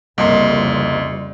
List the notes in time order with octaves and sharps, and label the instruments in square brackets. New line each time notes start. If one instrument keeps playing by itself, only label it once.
[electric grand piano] C2 C6 [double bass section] F2 C#3 G3 [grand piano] A#3 D#5